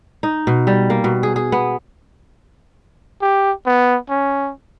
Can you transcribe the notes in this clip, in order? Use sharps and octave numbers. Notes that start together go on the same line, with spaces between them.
D#4
B2
G3
A#3
B2
G#4
G#4
B3
G4
B3
C#4